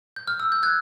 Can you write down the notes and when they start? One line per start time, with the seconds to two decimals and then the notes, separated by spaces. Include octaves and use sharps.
0.16 G6
0.28 F6
0.40 E6
0.52 G6
0.63 F#6 G#6